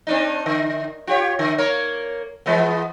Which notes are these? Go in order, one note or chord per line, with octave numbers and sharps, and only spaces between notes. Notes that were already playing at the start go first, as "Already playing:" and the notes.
C4 D4 D#4
D3
F4 G4 C#5
D3
A#3 A#4 C#5
E3 G#3 B3